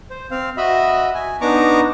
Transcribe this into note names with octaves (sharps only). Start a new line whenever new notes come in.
C5
C4 F5
F#4 D#5 E5 B5
G#5
B3 D4 D#4 A#5 C#6 D6